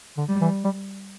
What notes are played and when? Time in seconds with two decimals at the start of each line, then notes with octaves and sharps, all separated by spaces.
0.17 D3
0.29 G3
0.41 E3
0.64 G3